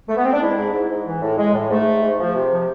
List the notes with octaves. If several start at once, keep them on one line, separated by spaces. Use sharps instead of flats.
A3
B3
C4
D4
G#3 E4
G#2
G#2
G#2
E3
A2
G#3
A2
G#2 A3
G#2
G#2
F3
C3
F3